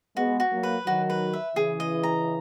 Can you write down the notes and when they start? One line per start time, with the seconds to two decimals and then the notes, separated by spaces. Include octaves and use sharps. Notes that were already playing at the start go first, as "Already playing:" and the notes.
0.17 G#3 B3 F#4
0.40 F#4
0.52 F#3 A#3
0.63 B4
0.86 D#3 F#3 F#4
1.10 B4
1.33 E5
1.56 C#3 E3 G#4
1.80 D#5
2.03 A#5